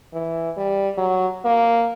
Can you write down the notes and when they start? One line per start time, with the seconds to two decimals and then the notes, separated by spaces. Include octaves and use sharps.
0.13 E3
0.57 G3
0.97 F#3
1.45 A#3